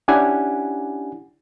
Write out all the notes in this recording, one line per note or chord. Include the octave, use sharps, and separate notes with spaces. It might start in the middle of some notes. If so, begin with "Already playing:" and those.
C#4 D4 E4 G4 F#5 G#5